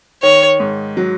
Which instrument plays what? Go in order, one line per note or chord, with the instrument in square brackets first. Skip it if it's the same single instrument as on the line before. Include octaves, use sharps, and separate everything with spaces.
[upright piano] D#3 [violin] C#5
[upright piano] G#2
F#3